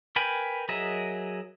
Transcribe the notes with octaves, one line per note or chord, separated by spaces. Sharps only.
A#4 B4 G5 G#5 B5
F#3 G#4 A#4 D#5 E5